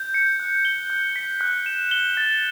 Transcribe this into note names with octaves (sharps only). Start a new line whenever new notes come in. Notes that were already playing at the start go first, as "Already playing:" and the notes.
Already playing: G6
C#7
F#6
G7
F#6
B6
F#6
E7
G7
A6